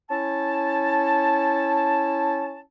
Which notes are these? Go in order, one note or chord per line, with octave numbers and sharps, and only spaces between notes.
C#4 E4 A5